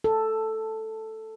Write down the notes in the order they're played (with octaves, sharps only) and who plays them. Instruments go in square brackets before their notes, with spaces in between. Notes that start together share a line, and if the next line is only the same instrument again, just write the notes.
[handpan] A4